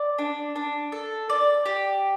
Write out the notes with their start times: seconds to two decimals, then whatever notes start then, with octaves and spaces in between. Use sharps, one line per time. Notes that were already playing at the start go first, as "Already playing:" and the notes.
Already playing: D5
0.19 D4
0.56 D4
0.92 A4
1.30 D5
1.66 G4